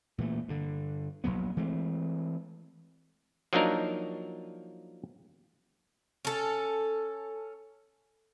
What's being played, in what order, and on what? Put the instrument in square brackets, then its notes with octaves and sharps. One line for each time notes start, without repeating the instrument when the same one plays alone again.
[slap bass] A#2 E3 A3
G2 D3
A#1 G2 F#3 B3
E3 G#3 A3 C4
[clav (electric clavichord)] F3 F#3 A#3 D4 D#4 A#4
[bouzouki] C#4 A4